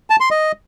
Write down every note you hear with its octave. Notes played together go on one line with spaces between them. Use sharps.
A5
C6
D#5